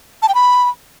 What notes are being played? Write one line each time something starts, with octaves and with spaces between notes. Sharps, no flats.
A5
G5
B5